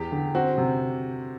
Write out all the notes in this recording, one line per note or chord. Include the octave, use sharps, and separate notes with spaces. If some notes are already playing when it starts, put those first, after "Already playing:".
Already playing: E2 G4
D3
C4 F#4
C3